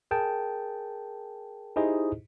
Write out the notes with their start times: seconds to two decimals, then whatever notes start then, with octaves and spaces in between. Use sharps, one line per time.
0.11 G#4 A#4 G5 A5
1.76 D#4 E4 G4 G#4 C5 D#5